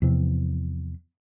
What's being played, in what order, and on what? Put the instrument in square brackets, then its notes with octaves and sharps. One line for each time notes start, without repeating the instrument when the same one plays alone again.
[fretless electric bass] E2 C3 F3